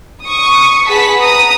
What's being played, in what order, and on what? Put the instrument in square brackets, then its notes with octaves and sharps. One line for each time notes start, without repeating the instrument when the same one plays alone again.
[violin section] C#6 D#6
G#4 B4 F#5 A5 B6
A#5 D#6